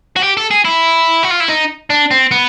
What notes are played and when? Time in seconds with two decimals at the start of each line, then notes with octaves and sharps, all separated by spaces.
0.16 F#4
0.23 G4
0.37 A4
0.51 G#4
0.65 E4
1.23 F#4
1.30 F4
1.40 E4
1.49 D#4
1.90 D4
2.11 C4
2.31 B3